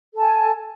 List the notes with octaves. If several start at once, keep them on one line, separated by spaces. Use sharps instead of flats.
A4 G#5 A5